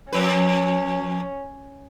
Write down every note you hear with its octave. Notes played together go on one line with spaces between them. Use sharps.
F2 C#4 B4